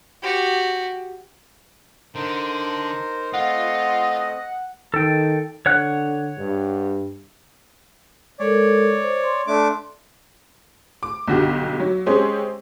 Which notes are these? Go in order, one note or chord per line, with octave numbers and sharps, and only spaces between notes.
F#4 G4
D3 D#4 A#4 C5
A3 C4 F4 D#5 F5 F#5
D#3 A4 G5
D3 C#5 F#5 F#6
G2
G#3 A4 A#4 C#5 D5
C5
C6
A3 D4 D6
D6
B1 G2 D3 F#4 G4
F#3
G#3 C4 C#4 G4 G#4